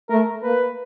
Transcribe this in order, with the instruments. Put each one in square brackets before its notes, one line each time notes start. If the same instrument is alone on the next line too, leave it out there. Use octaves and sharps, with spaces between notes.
[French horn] A3 [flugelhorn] A#4
[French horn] A#3 [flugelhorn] B4